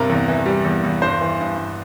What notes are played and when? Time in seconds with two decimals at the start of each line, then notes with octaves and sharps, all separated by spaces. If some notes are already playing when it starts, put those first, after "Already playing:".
Already playing: G2 C3 A#4
0.10 E2
0.28 E3
0.46 G3
0.64 E2
0.84 E2
1.02 G2 C5
1.21 E3
1.40 G2
1.58 G2